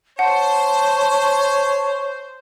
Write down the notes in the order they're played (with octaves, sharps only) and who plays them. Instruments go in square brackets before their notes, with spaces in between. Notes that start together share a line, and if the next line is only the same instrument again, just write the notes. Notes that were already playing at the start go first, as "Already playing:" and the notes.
[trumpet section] C5 [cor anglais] C#5 [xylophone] F#5 [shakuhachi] A5